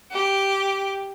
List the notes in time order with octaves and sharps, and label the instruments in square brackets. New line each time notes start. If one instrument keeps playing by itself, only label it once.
[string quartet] G4